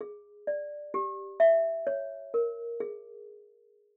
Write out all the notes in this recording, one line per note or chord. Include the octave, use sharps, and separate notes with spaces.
G#4
D5
G4
E5
C#5
A#4
G#4